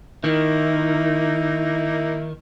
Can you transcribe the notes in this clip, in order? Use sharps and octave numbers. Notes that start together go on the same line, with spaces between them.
D#3 A#3 D#4 E4